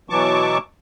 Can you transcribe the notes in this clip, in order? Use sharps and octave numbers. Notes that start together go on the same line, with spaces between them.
B2 E3 F#3 A5 C#6 D6